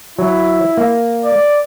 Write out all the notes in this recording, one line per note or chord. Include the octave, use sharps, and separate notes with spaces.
F#3 E4
A#3
D5